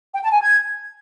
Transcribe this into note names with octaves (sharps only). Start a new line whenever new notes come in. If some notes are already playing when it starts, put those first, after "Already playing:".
G5
A5
G#5
G#6